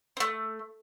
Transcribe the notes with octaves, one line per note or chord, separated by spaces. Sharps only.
A3 C4